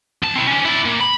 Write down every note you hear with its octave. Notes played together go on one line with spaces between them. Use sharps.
C#2 A5
C4 E4
C#4 D4
E4 D5
A#2
B5